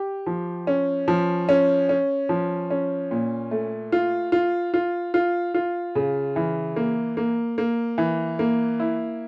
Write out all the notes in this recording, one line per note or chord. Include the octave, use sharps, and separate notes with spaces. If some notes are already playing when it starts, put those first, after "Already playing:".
Already playing: G4
F3
C#4
F3
C#4
C#4
F3
C#4
A#2
A3
F4
F4
F4
F4
F4
C#3
E3
A#3
A#3
A#3
E3
A#3
E4